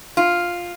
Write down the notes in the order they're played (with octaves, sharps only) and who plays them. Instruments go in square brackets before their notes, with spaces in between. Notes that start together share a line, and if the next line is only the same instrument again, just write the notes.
[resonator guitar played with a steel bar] F4